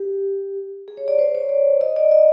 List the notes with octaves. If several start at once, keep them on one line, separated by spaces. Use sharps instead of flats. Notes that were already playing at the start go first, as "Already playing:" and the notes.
Already playing: G4
G#4
C#5
D5
C5
C#5
D5
D#5
D5
D#5